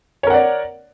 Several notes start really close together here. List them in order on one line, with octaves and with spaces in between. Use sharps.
C#5 A#4 F#5 D5